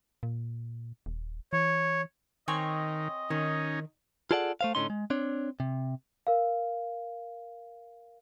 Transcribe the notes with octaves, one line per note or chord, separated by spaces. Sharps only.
A#2
D#1
E3 C#5
D#3 C4 C#5 D#5 G#5
D#3 C#4 D#4
F4 G#4 A4 D5 F5 F#5
A3 C5 F5
A2 D3 C#4 D#4 C6
G#3
C4 D4 C#5
C3
A#4 F5